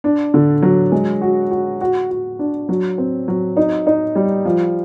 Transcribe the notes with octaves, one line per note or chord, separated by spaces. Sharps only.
D4
D3
F#3
G#3
F#4
F#4
F#4
F#4
D4
F#3
C4
F#3
D#4
D#4
G3
F3